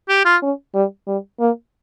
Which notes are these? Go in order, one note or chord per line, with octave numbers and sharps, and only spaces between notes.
G4
F4
C#4
G3
G3
A#3